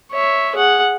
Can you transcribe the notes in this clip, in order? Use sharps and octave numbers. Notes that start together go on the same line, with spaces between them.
C#5 E5
G#4 F#5